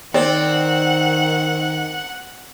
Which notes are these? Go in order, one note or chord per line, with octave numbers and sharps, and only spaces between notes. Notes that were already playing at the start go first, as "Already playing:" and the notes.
D#3 C4 D5 F#5